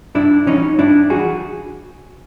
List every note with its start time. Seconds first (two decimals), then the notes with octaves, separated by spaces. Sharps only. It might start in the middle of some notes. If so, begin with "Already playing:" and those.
0.15 G2 D4 E4
0.46 E3 G3 C#4 D#4
0.78 G2 D4 E4
1.10 E3 G3 F#4 G#4